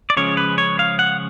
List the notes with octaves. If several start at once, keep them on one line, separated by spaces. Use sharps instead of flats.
D5
C#3 F3 G#3 C#4 C#5
B4
C#5
F5
F#5